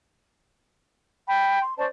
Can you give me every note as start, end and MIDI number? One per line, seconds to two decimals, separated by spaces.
1.27 1.59 79
1.27 1.59 83
1.62 1.75 84
1.77 1.85 61
1.77 1.85 72
1.77 1.85 74
1.77 1.85 81